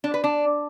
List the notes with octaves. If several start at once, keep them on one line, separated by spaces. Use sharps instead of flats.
D4
B4
D4